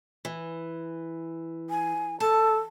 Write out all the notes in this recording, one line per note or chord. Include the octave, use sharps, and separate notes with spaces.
E3
G#5
A4 A5